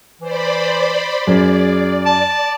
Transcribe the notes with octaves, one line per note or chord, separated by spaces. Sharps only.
E3 C5 D5 B5
F#2 G#4 D5
A5